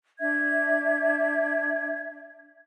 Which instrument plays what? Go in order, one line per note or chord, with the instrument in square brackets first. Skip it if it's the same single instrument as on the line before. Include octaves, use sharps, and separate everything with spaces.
[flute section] D4 E5 G#6